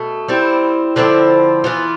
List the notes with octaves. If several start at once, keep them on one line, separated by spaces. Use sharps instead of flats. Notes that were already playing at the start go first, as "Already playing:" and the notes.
Already playing: B2 A3
G3 C4 E4
D3 F3 C4 E4
E3 B3 F4